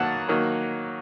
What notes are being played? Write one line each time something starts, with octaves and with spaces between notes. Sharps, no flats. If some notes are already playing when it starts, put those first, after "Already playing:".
Already playing: D#3 F#3 A#3 F#5 A5
D#3 F#3 A#3